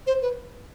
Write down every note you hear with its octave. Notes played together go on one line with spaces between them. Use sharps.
C5
B4